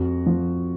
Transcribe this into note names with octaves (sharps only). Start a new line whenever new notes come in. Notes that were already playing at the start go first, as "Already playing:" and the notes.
Already playing: F2 F#4
F3